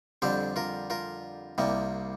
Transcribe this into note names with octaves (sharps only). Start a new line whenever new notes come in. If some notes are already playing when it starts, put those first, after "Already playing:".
F2 D3 G3 C4 G4 C5
F4 A#4
F4 A#4
C2 C3 G3 A#3